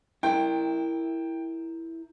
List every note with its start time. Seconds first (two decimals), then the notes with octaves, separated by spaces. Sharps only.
0.23 E4 A#4 G5